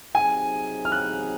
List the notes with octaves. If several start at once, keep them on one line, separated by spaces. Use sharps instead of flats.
C3 F#3 C4 D#4 G#4 G#5
F6
F#6